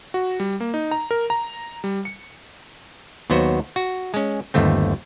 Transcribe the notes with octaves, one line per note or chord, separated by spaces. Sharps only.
F#4
G3
A#3
D#4
A#5
A#4
A#5
G3
C#7
D#2 F#3 B3 F#4 C5
F#4
G#3 C#4
G1 D#2 A3 C4